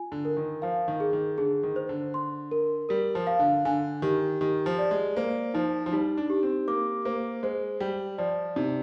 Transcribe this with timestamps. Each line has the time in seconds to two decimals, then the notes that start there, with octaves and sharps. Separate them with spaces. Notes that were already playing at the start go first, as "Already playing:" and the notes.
Already playing: F4 G#5
0.12 D3
0.25 A#4
0.37 D#3
0.62 F3 F5
0.88 D#3
1.00 G#4
1.13 D#3
1.38 D3 G#4
1.63 D#3
1.76 C5
1.89 D3
2.14 C6
2.51 A#4
2.89 G3 A#4
3.15 F3
3.27 F5
3.39 D3
3.65 D3 G#5
4.02 D#3 G4
4.41 D#3 G4
4.66 F3
4.78 D5
4.91 G#3
5.16 A#3 C5
5.54 F3 D#4
5.86 F3
5.92 G3 D#4
6.17 D4
6.30 G4
6.43 C4
6.68 A#3 D6
7.05 A#3 C5
7.43 G#3 C5
7.80 G3 G5
8.18 F3 D5
8.56 C3 D#4